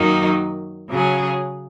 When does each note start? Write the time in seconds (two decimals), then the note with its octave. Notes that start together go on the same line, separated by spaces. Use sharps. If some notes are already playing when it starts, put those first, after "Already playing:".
Already playing: F#2 D#3 F#3 A#3 D#4
0.90 C#3 F#3 C#4 G#4